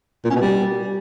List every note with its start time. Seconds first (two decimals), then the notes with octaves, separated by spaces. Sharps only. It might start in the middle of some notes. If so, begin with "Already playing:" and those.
0.25 A#2
0.30 C#4
0.36 B2
0.41 G3